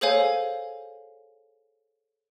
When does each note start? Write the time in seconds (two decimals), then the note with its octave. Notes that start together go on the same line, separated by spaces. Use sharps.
0.01 G#4 A4 C5 C#5 F5 G#5